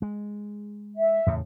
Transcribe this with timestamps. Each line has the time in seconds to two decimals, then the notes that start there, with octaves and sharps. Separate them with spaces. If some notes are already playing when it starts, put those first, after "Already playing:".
0.02 G#3
0.96 E5
1.26 E2 A2 C#3